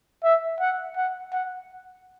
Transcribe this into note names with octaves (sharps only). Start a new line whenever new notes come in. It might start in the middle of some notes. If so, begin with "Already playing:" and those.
E5
F#5
F#5
F#5